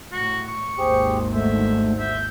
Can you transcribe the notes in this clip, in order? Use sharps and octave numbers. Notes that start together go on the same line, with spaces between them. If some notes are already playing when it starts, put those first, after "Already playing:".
A2 F#4
C#6
G#1 D#2 G4 G#4 C5
D3 A3 C5 E5
E5 G6